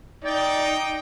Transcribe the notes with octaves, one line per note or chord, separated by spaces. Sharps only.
D#4 D5 G5